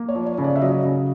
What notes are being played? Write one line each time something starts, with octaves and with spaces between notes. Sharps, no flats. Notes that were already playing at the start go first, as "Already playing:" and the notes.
Already playing: A#3
C#5
F3
C#5
C#3
D5
E5
F#3 D#5
C#3